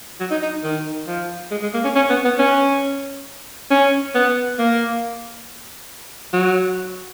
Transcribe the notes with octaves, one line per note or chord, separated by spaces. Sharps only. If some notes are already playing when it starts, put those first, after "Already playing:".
F#3
D#4
D#4
D#3
F3
G#3
G#3
A#3
C#4
C#4
B3
B3
C#4
C#4
B3
A#3
F#3